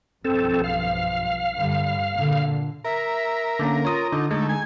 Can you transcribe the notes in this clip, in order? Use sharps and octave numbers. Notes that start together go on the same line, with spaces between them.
B1 G2 F3 C4 A4
F5
G2 D3 G3
A#2 D3
A#4 E5
D3 A#3 C#4
F4 C#5 D#6
D3 D#4
D3 G#3 A3 D#4
G#5